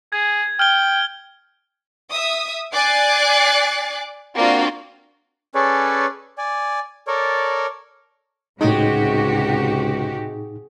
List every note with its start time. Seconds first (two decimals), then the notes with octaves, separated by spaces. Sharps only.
0.13 G#4 G#6
0.59 G5 F6 G7
2.10 E5 D#6
2.73 D5 G#5 D6 F#6 A6 C7
4.35 A#3 C4 D4 F4 F#4
5.55 C#4 G#4 A4 B4 C#5 D5
6.38 D5 G#5
7.07 A4 A#4 C#5 D5
8.61 C#2 A2 C3 G#3 D#4 F#4 G4